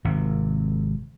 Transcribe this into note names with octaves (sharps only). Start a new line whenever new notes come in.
G#1 C3